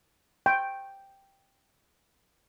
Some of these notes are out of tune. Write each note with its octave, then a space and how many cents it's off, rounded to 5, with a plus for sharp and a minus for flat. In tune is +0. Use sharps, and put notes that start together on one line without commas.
G5 +0